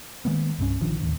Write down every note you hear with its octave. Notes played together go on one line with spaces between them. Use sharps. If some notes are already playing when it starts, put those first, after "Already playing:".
D#3 G#3 A#3 B3
C2 G2 G3 C#4
A#1 D3 D#3 F3
D#1 A1 D#2